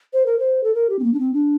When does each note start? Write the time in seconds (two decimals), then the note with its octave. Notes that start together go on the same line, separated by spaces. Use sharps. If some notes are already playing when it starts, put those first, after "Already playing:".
0.13 C5
0.26 A#4
0.39 C5
0.64 A4
0.75 A#4
0.89 G4
0.99 C4
1.04 A#3
1.14 D4
1.19 C4
1.34 D4